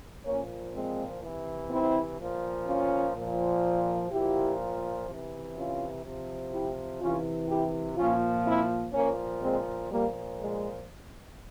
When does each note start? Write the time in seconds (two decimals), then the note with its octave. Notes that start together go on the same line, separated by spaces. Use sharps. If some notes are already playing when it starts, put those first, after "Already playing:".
0.25 A#2 F3 A#3 C#4
0.74 G#3 C4
1.22 C3 E3
1.69 C4 E4
2.19 A#2 F3
2.66 C#4 F4
3.14 A#2 F3
4.11 A#2 F3 E4 G4
5.08 C3 E3
5.56 C#4 F4
6.04 C3 F3
6.52 E4 G4
7.00 C3 E3 C#4 F4
7.48 E4 G4
7.97 A#2 F3 C#4 F4
8.45 C4 E4
8.93 A#2 F3 A#3 C#4
9.42 G#3 C4
9.90 A#2 F3 G3 A#3
10.38 G#3